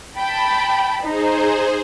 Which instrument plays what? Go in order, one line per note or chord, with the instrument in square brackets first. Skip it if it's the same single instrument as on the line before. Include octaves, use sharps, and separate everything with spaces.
[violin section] G5 A5 B5
[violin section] D#4 [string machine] G#4 C5